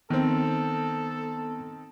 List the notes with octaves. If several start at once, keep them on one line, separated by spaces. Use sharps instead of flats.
D#3 B3 C4 A4